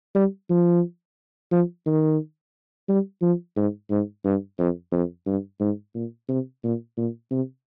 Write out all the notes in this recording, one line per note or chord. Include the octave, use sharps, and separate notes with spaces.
G3
F3
F3
D#3
G3
F3
G#2
G#2
G2
F2
F2
G2
G#2
A#2
C3
A#2
A#2
C3